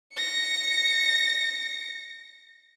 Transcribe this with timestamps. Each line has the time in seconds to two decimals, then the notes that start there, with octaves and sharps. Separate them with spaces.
0.14 A#6 C#7